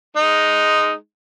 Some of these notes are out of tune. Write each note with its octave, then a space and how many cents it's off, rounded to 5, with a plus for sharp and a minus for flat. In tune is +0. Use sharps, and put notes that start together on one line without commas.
G#3 +0 D#4 +0